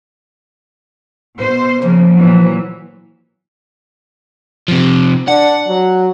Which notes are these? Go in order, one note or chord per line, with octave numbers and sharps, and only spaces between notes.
B2 C5
C#3 F3 A#3
A#2 E3 F#3
C3 F3
D4 F#5
F#3